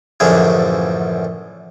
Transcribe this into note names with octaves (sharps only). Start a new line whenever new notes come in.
A1 F#2 D3 F3 G#4